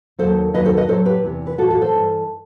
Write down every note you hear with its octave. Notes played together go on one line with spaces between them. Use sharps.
D#2 D#3 F#3 A4 C5
D#2 D#3 F#3 B4 D#5
A4 C5
B4 D#5
A2 F#3 A4 C5
G4 B4
E2 C3 E3
B4
A2 E3 F#4 A4
F#4 A4
A4 C5
G2 E3